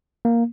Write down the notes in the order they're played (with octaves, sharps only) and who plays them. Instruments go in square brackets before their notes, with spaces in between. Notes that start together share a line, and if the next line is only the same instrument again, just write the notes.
[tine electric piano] A#3